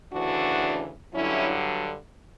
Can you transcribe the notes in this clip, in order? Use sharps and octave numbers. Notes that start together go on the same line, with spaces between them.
D2 C#3 E3 D4 F#4
G2 D3 F#3 C#4 E4